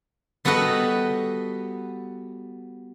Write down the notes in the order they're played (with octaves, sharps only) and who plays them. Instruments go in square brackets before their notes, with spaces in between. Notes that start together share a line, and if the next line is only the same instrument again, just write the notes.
[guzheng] G3 B3 F#4 A4 B4 D#5